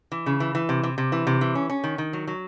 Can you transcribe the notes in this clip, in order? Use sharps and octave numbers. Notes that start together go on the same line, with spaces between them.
E3
C#3
E3
E3
C3
C3
C3
E3
C3
E3
C#4
C#4
D#3
D#3
F#3
F#3